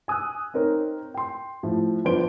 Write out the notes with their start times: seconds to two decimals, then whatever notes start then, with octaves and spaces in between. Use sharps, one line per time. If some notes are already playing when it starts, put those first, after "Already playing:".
0.08 G#5 D#6 E6 F#6
0.54 C4 D#4 A#4 C#5
1.14 G5 C6
1.63 A2 F3
2.05 G1 F3 D4 C5 D7 G7